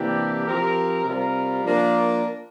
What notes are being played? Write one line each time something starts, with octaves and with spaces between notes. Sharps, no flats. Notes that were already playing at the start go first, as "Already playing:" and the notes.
Already playing: C3 E3 A#3 D4 G4
F3 C4 G4 A#4
C3 G3 C4 F4 A#4
F3 A#3 D4 F4 A#4